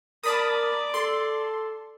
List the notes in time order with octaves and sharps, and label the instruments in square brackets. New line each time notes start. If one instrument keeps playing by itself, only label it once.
[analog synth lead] A#4 [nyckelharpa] D5 D6 [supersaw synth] A5 B5 D#6
[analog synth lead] A4 [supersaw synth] C6